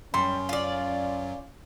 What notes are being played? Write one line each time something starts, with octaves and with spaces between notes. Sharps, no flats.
F#2 F#3 G3 C#4 C6
F4 D5